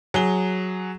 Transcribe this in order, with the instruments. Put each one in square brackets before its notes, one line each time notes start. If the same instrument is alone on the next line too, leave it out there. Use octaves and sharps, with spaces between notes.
[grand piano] F#3 G#4 G7